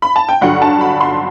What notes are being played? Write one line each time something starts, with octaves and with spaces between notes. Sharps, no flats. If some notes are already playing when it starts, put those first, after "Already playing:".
B5
A5
G5
G2 D3 F#3 F#5
A5
B5
C6